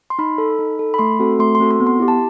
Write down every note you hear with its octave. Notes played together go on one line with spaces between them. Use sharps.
C6
D#4 B5
A4
D#4
A4
B5
A3 C6
C4 F#4 A4
A3 C6
C6
C4 F#4 A4
C6
B3
C6
E4 G4
A5